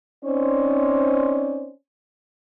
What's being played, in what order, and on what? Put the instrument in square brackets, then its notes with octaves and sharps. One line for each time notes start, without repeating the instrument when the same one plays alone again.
[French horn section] C4 C#4 D#4 C5 D5